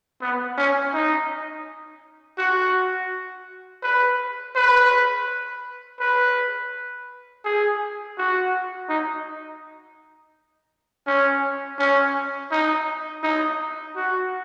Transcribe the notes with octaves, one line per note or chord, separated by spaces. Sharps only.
B3
C#4
D#4
F#4
B4
B4
B4
G#4
F#4
D#4
C#4
C#4
D#4
D#4
F#4